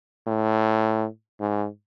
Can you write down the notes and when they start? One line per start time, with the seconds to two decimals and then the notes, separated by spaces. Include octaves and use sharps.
0.27 A2
1.40 G#2